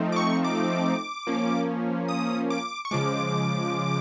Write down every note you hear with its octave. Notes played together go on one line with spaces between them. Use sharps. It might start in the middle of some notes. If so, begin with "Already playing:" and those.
Already playing: F3 A3 C4 D#4
D6
C#6
D6
F3 A#3 C#4
D#6
D6
C#6
C#3 F3 G#3 D6